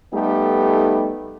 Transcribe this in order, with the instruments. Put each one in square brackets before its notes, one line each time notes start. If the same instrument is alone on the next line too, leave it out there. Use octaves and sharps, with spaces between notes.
[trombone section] G3 A3 B3 D#4 G4 A4